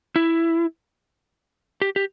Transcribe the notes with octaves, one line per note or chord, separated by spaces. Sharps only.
E4
G4
G4